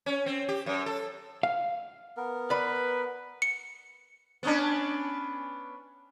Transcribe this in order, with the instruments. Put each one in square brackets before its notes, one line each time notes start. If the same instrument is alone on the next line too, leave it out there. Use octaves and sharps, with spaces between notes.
[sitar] C#4
C4
G4
F#2
A4
[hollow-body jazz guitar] F5
[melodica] B3 A#4
[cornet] B4 [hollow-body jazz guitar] D5 B5
[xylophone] C#7
[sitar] B3 C#4 D4